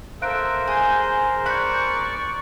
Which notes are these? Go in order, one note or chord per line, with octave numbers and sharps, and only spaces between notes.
A4 A#4 C5 E5 F5 F#6 D7
G#4 G6
D5 B5 C#6 F#6 G6